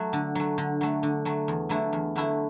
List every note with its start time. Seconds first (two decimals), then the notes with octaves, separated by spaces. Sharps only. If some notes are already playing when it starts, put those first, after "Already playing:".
Already playing: F#3 A3
0.13 D3
0.35 F#3 A3
0.58 D3
0.81 F#3 A3
1.03 D3
1.25 F#3 A3
1.48 E2
1.69 D3 F#3 A3 E4
1.93 E2
2.16 D3 F#3 A3 E4